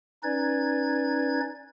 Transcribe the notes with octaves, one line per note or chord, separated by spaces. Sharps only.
C#4 D#4 B4 D5 G#6